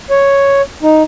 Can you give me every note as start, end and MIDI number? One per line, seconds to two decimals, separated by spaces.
0.10 0.62 73
0.83 1.03 63